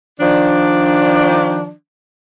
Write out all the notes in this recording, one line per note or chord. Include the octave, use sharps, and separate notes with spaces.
D#3 F3 D4